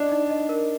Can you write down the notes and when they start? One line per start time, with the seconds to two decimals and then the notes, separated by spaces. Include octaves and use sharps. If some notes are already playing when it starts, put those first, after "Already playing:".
Already playing: D4 D#5
0.12 D#4
0.30 D#5
0.49 A#4